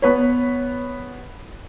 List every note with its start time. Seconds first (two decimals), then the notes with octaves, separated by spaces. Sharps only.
0.02 B3 B4 C#5